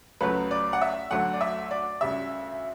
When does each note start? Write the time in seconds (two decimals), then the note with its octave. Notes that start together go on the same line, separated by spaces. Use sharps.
0.21 C#2 C#3 F#3 A3 B4
0.51 D5
0.73 F#5
0.81 E5
1.10 D2 D3 F#3 A3 F#5
1.33 D5
1.41 E5
1.71 D5
2.01 D2 C#3 G3 E5